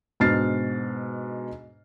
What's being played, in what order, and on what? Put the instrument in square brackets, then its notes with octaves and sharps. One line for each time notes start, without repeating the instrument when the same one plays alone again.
[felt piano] G#2 B2 D4 F6 A6 C7